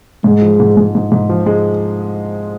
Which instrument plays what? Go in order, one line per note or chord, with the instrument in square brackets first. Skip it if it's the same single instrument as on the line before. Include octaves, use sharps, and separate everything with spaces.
[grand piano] G#2 [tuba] G#3
[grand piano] F3
G#2
G#2
G#2
G#2
F3
G#3